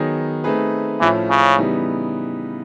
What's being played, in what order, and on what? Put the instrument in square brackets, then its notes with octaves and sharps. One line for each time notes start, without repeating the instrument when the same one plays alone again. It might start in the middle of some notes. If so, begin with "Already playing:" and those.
Already playing: [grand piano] D#3 F#3 B3 D#4 G#4
A3 C4 D#4 G#4 B4
[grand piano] A2 F3 A3 C#4 E4 [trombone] E3
[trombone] C#3
[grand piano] C#3 E3 G3 B3 D#4